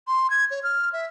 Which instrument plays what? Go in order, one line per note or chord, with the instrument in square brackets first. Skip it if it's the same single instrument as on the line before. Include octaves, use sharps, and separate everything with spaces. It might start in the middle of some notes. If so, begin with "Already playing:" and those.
[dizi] C6
G#6
C#5
F6
E5